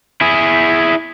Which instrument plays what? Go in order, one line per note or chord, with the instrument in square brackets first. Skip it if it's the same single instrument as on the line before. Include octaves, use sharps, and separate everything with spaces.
[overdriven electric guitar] E4 G#4